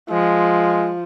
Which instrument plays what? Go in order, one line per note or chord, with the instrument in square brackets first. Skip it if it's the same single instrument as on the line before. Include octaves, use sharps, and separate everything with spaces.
[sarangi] F3 [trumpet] G#3